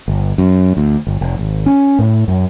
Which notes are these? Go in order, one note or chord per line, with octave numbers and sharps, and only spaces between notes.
G1
F#2
D2
G1
F1
G#1
C#4
A2
F#2